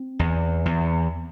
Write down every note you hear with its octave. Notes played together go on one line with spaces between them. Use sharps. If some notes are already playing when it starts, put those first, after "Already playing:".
Already playing: C4
E2
E2